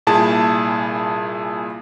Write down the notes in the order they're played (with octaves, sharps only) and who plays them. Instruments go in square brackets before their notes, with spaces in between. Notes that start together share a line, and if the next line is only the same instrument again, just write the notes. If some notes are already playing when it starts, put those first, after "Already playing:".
[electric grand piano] C2 A#2 E4 G#4 A5